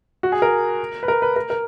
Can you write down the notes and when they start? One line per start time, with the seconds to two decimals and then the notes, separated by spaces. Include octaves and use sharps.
0.23 F#4
0.32 G#4
0.42 A#4
1.03 B4
1.08 A#4
1.22 B4
1.36 A#4
1.50 A#4